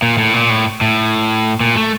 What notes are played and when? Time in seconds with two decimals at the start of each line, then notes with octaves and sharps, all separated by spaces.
0.02 A#2
0.18 A2
0.34 A#2
0.50 A2
0.81 A2
1.61 A#2
1.76 A3